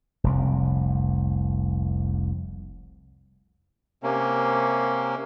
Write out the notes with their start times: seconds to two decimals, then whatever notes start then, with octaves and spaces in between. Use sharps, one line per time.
0.24 F1 C2
4.03 C3 A#3 C#4